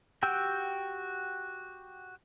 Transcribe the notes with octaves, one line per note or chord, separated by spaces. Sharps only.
F#4 G4 F#5 G5 E6